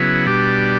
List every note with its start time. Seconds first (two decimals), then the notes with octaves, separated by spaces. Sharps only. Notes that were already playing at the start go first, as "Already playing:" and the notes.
Already playing: C#3 F#3 B3 E4
0.26 B2 G3 D4 G4